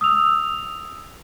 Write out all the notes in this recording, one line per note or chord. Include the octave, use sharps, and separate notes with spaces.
D#6 E6 F7